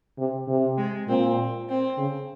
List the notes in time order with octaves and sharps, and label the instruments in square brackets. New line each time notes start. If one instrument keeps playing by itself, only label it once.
[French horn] C3
C3
[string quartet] G#3
[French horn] A#2 [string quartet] C4
[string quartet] C4
[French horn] C#3